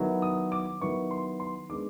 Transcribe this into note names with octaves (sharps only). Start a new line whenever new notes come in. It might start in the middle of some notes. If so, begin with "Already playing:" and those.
Already playing: D#3 F#3 B3 E4
D#6
D6
D#3 F#3 B3 E4 C#6
C6
C6
D#3 G#3 B3 D4 D6